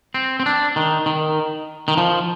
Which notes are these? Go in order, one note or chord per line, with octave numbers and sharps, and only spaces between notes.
C4
C4
D4
D#3
D#3
D#3
F3